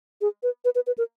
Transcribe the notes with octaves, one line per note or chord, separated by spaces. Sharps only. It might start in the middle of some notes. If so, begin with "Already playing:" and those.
G#4
B4
B4
B4
B4
A#4